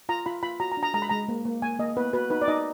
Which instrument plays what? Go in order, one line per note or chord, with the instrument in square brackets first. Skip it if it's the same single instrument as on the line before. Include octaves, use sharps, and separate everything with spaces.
[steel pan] F4 A#5
F4 B5
F4 B5
F#4 A#5
A#5
D4
A#5
G#3 A#5
B5
G#3 A#5
A#3
A#3
A#3 G#5
A#3 D#5
B3 B4
F#4 B4
D#4 B4
D5
D#4 D#5